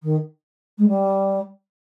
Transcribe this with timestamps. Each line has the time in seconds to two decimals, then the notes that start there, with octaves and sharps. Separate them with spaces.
0.03 D#3
0.78 G#3
0.88 G3